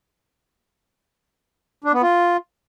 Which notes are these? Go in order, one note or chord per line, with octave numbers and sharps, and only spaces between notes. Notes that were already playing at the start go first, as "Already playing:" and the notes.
D4
B3
F4